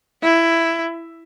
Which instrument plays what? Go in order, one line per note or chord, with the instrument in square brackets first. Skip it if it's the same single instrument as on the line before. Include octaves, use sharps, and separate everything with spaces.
[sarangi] E4